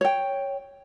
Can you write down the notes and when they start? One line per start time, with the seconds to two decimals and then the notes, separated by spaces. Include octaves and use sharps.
0.01 C#5 G5